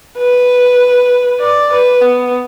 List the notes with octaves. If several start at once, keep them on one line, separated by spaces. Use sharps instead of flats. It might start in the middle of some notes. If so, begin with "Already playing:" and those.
B4
D5
B4
B3